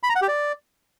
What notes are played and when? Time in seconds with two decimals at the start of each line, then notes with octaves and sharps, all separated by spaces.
0.03 B5
0.09 A#5
0.16 F#5
0.22 G4
0.28 D5